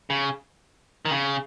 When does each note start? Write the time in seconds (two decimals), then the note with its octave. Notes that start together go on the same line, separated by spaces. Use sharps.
0.10 C#3
1.05 D#3
1.11 C#3